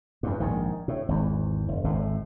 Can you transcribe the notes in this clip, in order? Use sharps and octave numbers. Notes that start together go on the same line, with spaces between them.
E2 G2
A#1 G#2 D#3
A2
G#1 E2
F#1
G#1 A2